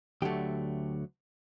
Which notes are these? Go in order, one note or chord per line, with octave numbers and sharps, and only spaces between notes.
D2 D3 F#3 A3 G4